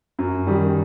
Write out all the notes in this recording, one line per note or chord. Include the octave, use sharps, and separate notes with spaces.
F#2
D#3 G3